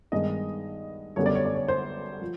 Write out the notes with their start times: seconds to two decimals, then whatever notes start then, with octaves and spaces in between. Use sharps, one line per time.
0.12 G2 D#3 G#3 B3 D#5
1.16 F#2 D3 G3 B3 C#5
1.26 D5
1.35 C#5
1.45 D5
1.54 C#5
1.68 C5
2.21 F3